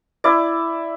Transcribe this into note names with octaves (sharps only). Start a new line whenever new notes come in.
E4 D5